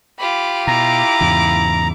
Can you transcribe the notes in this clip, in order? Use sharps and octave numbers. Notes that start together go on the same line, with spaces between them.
F4 G4 B5 D6
B2 E4 A#5 D6
E2 G#2 C#3